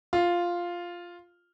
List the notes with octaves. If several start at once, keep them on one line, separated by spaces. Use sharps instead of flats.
F4